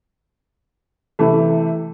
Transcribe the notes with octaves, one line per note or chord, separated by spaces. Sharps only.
C3 E3 A3